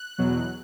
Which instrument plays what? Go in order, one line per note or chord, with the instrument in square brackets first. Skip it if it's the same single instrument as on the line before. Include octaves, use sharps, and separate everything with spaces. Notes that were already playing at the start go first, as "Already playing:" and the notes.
Already playing: [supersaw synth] F#6
E2 B2 F#3